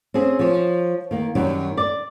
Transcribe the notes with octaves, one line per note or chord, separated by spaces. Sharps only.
C4 C#4 G#4
F3 C#5
D#3 A#3
F#2 D#3 F#3 G3
D5